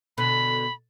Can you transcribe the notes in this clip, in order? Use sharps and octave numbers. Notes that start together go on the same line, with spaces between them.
B2 D3 B5